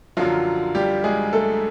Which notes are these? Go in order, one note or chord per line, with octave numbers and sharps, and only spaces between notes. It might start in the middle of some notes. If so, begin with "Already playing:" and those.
F#2 D3 F3 F#3 F4
G3 G4
G#3 G#4
A3 A4